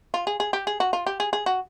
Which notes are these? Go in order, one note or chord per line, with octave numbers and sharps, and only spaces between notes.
F4
G#4
G#4
G4
G#4
F#4
F4
G4
G#4
G#4
F#4